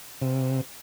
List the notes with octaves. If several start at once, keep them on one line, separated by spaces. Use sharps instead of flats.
C3